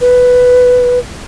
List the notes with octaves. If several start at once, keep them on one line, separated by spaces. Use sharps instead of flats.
B4